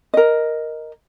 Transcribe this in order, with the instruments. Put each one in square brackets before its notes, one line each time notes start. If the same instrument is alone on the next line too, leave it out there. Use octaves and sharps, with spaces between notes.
[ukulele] A#4 D#5